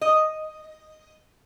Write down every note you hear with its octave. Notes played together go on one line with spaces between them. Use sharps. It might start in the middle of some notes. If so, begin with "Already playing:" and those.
D#5